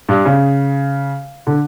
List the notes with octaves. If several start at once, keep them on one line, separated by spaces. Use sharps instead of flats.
G2
C#3
D3